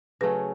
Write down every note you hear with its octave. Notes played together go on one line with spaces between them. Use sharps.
C#3 F#3 A3 C#4 B4